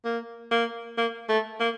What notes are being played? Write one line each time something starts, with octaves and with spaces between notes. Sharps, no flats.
A#3
A#3
A#3
A3
A#3